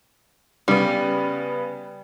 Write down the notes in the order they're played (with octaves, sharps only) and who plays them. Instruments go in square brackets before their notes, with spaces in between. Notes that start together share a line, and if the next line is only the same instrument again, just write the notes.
[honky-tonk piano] C#3 B3 [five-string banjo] G3